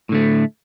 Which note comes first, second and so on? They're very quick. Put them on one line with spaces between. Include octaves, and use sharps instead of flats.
A2 D3 A3